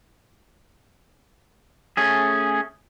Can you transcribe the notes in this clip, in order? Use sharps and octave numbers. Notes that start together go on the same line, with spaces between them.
A3 C#4 G#4